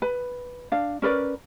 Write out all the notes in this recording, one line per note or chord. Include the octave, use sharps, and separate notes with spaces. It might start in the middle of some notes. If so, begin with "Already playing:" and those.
B4 B5
D4 F5
C#4 A#4 B4 D5